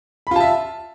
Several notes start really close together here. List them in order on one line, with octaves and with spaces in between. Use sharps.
B5 F4 A5 E5